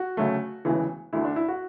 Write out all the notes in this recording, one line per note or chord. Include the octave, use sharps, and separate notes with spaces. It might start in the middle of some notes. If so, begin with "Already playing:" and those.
Already playing: F#4
D2 C#3 F#3 A3
E1 D2 C#3 E3
D2 D3 A3 E4
D4
E4
F#4